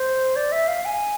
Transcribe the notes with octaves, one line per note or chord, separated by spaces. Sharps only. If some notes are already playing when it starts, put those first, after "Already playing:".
Already playing: C5
D5
E5
F5
G#5